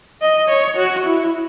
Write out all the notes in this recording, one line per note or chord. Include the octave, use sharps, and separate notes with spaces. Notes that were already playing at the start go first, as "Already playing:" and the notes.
D#5
C#5
F#4
E4